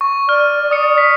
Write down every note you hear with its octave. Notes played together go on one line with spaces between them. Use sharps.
C#6
D5 F6
D#6 C#7
B6